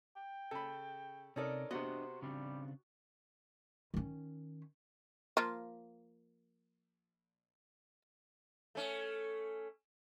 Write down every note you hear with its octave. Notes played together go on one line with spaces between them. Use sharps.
G5
C#3 A4 B5
C3 C#4 D#4 A4 A#4 D5 D#5
C3 B3 D4 F#4 B4 C5 D#5
C#3 G3 C4 D4
D#3 C#4
F3 A#3 F4
A3 C#4